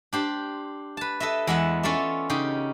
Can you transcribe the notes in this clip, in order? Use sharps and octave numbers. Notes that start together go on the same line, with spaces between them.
D4 G4 C5
B4 A5
A4 B4 D#5 E5
E2 G#3 B3 E5 F#5
C#4 F4 A4 D5 E5
C#3 D#4 G4